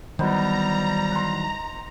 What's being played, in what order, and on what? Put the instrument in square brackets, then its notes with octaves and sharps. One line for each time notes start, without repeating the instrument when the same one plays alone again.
[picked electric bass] D#3 E3 F#3 [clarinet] G3 [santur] B3 D#4 C5 [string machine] A#5
[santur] F#5 C6